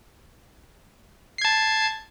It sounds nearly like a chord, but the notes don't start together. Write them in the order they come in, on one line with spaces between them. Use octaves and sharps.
C7 G#6 A5